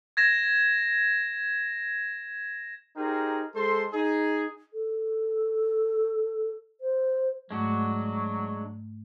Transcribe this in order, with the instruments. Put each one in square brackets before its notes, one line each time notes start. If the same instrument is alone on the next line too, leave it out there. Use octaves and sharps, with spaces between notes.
[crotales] G#6 A#6 E7
[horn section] D#4 G4 G#4 A#4 C5
G#3 A4 C5 C6
D#4 G#4
[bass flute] A4
C5
[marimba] G#2 A3 [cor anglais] F#3 [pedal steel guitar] G#3 D4 F#4